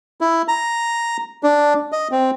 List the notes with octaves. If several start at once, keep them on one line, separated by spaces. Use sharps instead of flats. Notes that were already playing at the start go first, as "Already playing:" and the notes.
E4
A#5
D4
D#5
C4